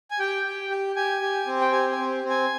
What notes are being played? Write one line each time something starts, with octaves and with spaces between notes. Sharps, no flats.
G#5
G4 G5
G4
G4
G4 G#5
G4
C4
G5
G4 G#5
G#5
C4
C4
G#5